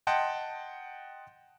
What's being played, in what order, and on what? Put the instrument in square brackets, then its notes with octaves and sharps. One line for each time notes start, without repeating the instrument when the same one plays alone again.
[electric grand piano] D#5 F#5 G5 A5 C6